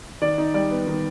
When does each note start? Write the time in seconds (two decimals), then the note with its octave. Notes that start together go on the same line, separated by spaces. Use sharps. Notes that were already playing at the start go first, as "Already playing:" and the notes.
0.22 D#3 D5
0.38 D#4
0.54 G3 D5
0.71 B3
0.87 D#3